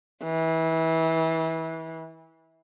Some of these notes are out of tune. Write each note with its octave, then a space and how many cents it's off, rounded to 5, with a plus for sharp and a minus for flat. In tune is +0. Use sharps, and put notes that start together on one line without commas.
E3 -25